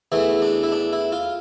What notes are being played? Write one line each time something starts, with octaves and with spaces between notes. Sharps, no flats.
E2 E3 A3 E4
D4
E4
D4
E4
F4